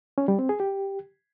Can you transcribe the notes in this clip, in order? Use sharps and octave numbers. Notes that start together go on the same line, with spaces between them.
C#4
G3
C4
G#4
G4